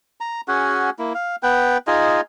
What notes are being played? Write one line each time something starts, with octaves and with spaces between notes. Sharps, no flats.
A#5
C#4 F#4 G#4 F#5
A#3 E4
F5
B3 B4 G5
D#4 F4 G#4 D#5